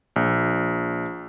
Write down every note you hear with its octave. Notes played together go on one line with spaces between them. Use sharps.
A#1